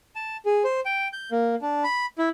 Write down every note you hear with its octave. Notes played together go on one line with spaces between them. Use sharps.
A5
G#4
C5
G5
G6
A#3
D4
B5
E4